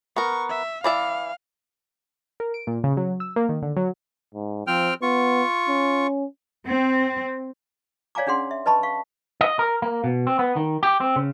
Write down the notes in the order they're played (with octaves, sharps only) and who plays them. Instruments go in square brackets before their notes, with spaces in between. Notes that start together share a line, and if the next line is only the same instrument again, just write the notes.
[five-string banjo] B3 A#4 [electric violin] C#6
[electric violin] E5
[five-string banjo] E3 D5 E5 [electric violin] F5
[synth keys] A#4
D7
A#2
C#3
F#3
E6
A#3
D#3
D3
F#3
[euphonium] G#2
[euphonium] F3 [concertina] C4 G5 F6
[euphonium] B3 [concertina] F4 C#6
[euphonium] C#4
[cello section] C4
[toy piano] C#5 D5 F5 G#5 A#5 D6
C#4 D4 G#4 F#5 C6
E5
B4 D#5 A5 B5 C#6
F5 C#6
[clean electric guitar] D#5
A#4
A#3
B2
C4
B3
D#3
G4
C4
C#3